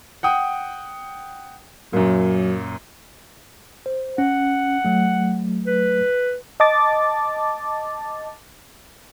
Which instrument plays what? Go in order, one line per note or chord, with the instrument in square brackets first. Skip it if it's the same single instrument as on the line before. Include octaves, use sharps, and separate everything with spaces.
[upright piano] F#5 G5 D#6
[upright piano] F#2 A#2 [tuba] F#3
[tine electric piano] C5
[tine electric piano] C#4 [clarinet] F#5
[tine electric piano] F#3 A3
[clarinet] B4
[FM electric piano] D#5 A5 D6 A6